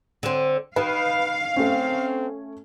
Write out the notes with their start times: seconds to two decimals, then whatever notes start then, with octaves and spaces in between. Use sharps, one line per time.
0.23 D3 C4
0.76 D#3 B4 F5
1.56 A3 C4 C#4